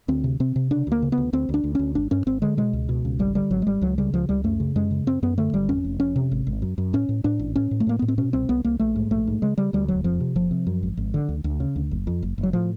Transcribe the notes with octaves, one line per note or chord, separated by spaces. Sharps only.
D2 C4
C3
C3 C4
C3
C#3 D4
D2 A#3
C#3
B3
D2
D2 C4
D2
D4
D2
D2 C#4
G#1 D4
G2 C#4
G#1 C4
D3 G#3
B2 G#3
C#2
B2
C#2
G#1 G3
D3 G3
G#1 F#3
G#3
G#1 G3
C#2 F#3
C#3 G3
C#2 F3
C#2 G3
F#2 A3
C#3
F#2 G#3
C#3
F#2 C4
F#2 B3
D3 A3
G#1 G3
F2 C#4
F1
F2 C#4
C3
G#1
G#1
F#2
F#2
A2 C#4
A2
A2 D4
A1
A2 C#4
A2
A3
A2 A#3
A2 B3
C4
B2 C#4
C2 C4
C2 B3
C2 A#3
A#1 A3
G#2
A#1 A3
G#2
C#3 G#3
C#3 G3
D2 G3
E1 F#3
F2 F3
C3
F#1 F3
C3
F#2
G#1
G#1
D3
D2
D2
C#3
D2
F#1
F2
F#1
F#1
F#3
A2 F3